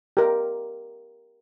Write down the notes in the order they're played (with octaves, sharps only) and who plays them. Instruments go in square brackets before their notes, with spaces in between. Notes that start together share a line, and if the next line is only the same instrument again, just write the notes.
[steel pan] G4 A#4